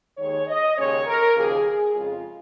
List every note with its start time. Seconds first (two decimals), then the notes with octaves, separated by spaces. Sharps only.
0.17 D#2 D#3 G#3 C#5
0.47 D#5
0.76 D#2 C#3 G#3 C#4 C#5
1.05 A#4
1.35 D#2 C#3 F3 A#3 G#4
1.64 G#4
1.93 F2 C#3 G#3 F4